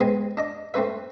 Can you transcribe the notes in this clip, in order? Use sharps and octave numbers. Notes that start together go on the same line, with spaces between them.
G#3 B3 C4 G#4
D4 D#5 D6
A3 C4 C#4 B4 E5